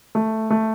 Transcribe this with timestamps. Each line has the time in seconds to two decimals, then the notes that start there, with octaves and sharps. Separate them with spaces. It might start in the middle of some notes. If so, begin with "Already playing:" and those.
0.15 A3
0.50 A3